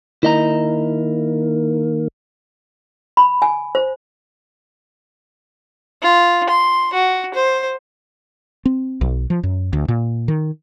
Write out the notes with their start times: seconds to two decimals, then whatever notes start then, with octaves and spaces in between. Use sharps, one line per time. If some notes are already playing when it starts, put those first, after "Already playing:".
0.23 D#3 A#3 E4 D#5 A#5
3.17 B5
3.42 G#5
3.75 C5
6.02 F4
6.49 C6
6.93 F#4
7.34 C5
8.66 C4
9.01 B1
9.30 F3
9.43 F#2
9.73 D2
9.88 A#2
10.28 D#3